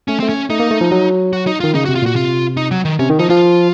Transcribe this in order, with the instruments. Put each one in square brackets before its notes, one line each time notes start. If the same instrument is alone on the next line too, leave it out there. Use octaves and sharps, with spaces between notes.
[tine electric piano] A3 [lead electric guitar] C#4
[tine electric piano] A3 [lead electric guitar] C4
[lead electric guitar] C#4
[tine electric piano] A3 [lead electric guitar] D#4
[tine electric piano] A#3
A3
F3
F#3
[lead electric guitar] F#4
D#4
[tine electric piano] D#3 [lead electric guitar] F4
[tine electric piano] C#3 [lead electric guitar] D#4
[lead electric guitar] F#4
[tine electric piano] C3
[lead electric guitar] F4
[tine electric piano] A#2 [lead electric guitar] F#4
[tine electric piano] C3 [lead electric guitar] F4
[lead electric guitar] D#4
F#3
D#3
[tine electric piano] C3 [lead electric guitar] C#4
[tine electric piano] D#3
[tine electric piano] F3 [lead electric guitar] D#4
[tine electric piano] F3 [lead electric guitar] F4